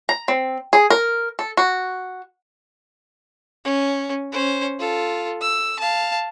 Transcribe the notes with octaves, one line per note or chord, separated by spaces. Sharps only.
A#5
C4
G#4
A#4
A4
F#4
C#4
C#4 C5
F4 A4
E6
F5 A5